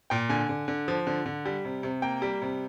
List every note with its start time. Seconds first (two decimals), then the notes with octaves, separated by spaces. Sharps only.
0.10 A#2 G5
0.29 D3 G#5
0.49 D3
0.68 D3
0.88 F3
1.07 D3
1.26 D3
1.46 G3
1.65 C3
1.83 C3
2.02 A#3 G5
2.22 G3
2.42 C3